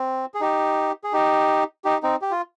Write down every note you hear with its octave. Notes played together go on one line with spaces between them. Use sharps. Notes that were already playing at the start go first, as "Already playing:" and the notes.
Already playing: C4
G#4
D#4 G4
G#4
D#4 G4
D#4 G4
C4 D#4
G4
F4